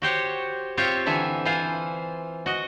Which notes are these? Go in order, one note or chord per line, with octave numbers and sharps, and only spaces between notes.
F#4 G4 C5 C#5
C4 F4 G4 C#5 E5 G5
D3 E3 E5 G#5
E3 F4 C5 G#5
F#4 D#5